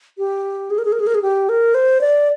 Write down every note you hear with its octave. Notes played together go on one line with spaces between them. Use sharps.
G4
G#4
A#4
G#4
A#4
G#4
A#4
G#4
G4
A#4
C5
D5